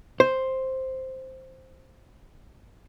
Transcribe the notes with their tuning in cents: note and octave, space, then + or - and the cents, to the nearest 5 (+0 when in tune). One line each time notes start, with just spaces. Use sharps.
C5 +5